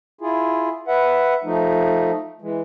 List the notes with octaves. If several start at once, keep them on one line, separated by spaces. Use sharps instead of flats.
E4 F4 G#4
B4 E5 F#5
F3 A3 D#4
E3 G#3